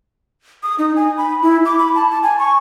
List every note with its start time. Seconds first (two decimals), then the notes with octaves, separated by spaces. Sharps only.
0.63 D#6
0.79 D#4
0.96 G#5
1.18 B5
1.43 E4
1.65 D6
1.79 B5
1.95 A5
2.10 A5
2.23 G#5
2.39 C#6